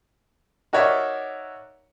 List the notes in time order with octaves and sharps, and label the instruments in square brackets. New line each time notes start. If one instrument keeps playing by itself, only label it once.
[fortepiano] D#4 F#4 A#4 C#5 D5 E5